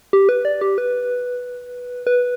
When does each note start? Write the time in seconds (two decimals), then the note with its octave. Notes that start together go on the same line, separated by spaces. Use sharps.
0.13 G4
0.29 B4
0.45 D5
0.61 G4
0.78 B4
2.07 B4